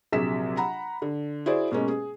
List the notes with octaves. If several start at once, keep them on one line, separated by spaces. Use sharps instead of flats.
A#1 C3 F#3 G#4 B6 E7
F#5 A#5 B5
D3
E4 F#4 G#4 C5 D5
B2 G#3 A#3 C#4
G#4